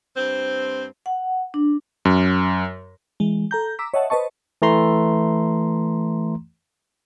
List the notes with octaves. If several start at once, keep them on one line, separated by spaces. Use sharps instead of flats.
G2 C4
F#5
D4
F#2
E3 G#3
A4 A#5 G6
A#5 D6 E6 B6
C#5 D#5 E5 F#5 A5
B4 C5 D#5 A5 C#6
E3 A3 A#5 C6